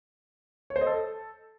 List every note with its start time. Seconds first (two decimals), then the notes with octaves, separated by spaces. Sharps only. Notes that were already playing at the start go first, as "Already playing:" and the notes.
0.70 C#5
0.76 C5
0.81 D#5
0.87 A4